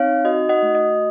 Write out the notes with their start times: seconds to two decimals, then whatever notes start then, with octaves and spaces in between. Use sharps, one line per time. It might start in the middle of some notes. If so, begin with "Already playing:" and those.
Already playing: C4 D#4 C#5 F5
0.25 F#4 D#5
0.49 D#5 F#5
0.63 A3
0.75 D#5